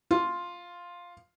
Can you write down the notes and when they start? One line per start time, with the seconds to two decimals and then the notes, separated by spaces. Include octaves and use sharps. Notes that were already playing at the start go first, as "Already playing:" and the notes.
0.11 F4